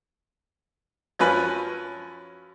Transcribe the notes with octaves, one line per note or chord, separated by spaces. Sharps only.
F#2 F3 C#4 B4 G#5 B5